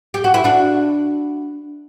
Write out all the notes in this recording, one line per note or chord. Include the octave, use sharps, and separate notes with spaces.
G4
F#4
E4
D4 F#4